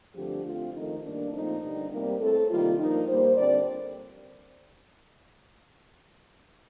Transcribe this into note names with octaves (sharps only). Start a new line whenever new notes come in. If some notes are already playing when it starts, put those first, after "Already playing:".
G2 D3 F3 A3 C4 G4
D3 A3 C4 F4
F2 D#3 A3 D#4
G2 D#3 A#3 D4
A#2 F3 A3 C4 D#4
G2 D3 G3
C3 G3 A#3
A2 A3 C4 A4
C3 D#3 G3 A#3 F4
G2 F3 A#3 D#4
A#2 G3 A#3 C5
G2 D3 G3 C4 D5